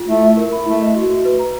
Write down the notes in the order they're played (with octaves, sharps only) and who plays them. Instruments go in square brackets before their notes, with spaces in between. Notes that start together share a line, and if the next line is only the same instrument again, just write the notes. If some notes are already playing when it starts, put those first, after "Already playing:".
Already playing: [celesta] F4
[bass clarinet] A3 [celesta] E4
[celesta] E5
A#4
B5
[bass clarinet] A3 [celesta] E4
[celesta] D#5
F#4
F#4
B4
A#5